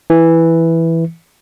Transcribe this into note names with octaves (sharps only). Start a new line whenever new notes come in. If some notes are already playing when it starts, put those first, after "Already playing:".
E3